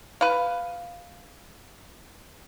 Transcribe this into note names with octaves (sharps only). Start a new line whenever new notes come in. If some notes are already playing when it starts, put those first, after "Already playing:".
B4 F5